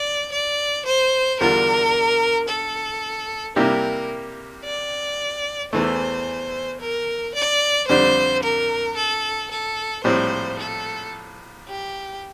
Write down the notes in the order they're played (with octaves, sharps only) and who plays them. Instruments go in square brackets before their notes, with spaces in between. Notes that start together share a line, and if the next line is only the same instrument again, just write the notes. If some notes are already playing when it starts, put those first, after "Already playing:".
Already playing: [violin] D5
D5
C5
[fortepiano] E2 D3 G3 D4 F4 [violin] A#4
[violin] A4
[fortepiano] C3 G3 A#3 E4 G4 [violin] A#4
[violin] D5
[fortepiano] E2 E3 A3 [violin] C5
[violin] A#4
D5
[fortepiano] F2 D3 G3 D4 [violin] C5
[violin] A#4
A4
A4
[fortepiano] A#1 A2 G3 C4 [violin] C5
[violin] A4
G4